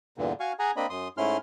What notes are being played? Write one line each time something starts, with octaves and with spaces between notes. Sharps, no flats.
E2 G2 A#2 D3
F#4 F5 G#5 C#6
G#4 F#5 G#5 A#5
A#3 C4 D4 D#5 B5
F#2 C6 D#6
G#2 A3 C#4 E4 C6 F6